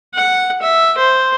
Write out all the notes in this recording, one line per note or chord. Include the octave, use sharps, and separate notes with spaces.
F#5
E5
C5